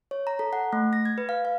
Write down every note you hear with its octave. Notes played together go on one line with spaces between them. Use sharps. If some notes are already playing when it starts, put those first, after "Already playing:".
C#5
A#5
A4
F#5
A3
A#6
G#6
B4
F5
F5